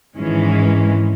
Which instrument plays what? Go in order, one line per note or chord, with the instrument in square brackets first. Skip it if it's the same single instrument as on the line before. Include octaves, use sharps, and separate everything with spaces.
[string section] G#1 G#2 E3 G#3 C#4